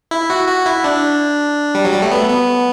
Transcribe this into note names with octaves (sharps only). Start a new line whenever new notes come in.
E4
F#4
F#4
E4
D4
G3
F#3
G3
A3
B3
B3